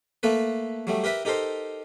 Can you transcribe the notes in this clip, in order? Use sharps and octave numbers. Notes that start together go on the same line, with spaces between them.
A3 A#3 A4 B4
F#3 G3 A3
G4 A#4 B4 E5
D#4 G4 A4 A#4 C5